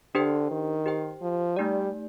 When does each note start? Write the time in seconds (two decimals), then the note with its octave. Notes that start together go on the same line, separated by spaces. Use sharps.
0.14 D3 D4 G4 C5 G5
0.51 D#3
0.86 G4 C5 G5
1.22 F3
1.56 G3 A3 D#4 G4 D5